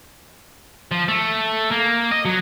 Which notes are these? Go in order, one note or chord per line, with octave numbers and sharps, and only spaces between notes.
F3
A3
A#3
D#5
F#3